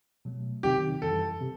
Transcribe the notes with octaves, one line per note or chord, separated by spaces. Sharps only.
B2 F#3 A3
C3 D#3 F#3 C4 D#4 G4
F#2 E3 G3 A4
C3